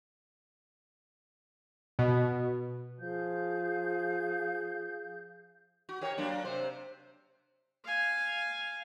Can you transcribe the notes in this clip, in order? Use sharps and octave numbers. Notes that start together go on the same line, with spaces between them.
B2
F3 G#4 F5 G6
F#4
G4 A#4 C#5
F#3 A#3 D4
C3 C5
F5 G#5